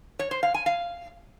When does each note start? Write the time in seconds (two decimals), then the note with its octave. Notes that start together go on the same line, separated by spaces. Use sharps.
0.19 C#5
0.31 C5
0.43 F5
0.54 G#5
0.66 F5